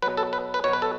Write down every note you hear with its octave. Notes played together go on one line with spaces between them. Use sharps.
B2 F#3 B4
A4
B4
B4
B2 F#3 B4 C#5
A4